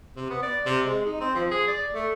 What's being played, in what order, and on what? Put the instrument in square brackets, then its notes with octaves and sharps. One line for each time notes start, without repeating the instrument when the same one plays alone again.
[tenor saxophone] C3
B3
D5
C3
G#3
D#4
C4
F3
G#4
D5
A3